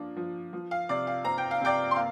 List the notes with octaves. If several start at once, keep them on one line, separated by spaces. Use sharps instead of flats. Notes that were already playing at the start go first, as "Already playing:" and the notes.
Already playing: F3 A#3 D4
F3
F3
F5
C3 D5
F5
C4 A#5
G5
F5
C3 D5 G5
C6
A#3 F5